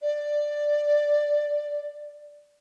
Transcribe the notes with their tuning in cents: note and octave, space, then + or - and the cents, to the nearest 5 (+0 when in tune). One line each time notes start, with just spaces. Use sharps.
D5 +5